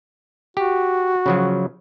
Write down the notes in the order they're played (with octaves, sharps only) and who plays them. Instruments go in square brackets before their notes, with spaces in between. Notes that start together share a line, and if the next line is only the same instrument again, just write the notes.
[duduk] F#4 [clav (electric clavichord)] G4
[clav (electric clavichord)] C#3 F3 F#3